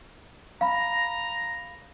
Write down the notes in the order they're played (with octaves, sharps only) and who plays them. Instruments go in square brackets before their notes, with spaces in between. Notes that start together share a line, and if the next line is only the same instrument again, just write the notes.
[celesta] F5 B5 [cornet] A#5